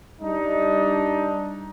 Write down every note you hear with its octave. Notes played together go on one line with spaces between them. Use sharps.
G3 D4 D#4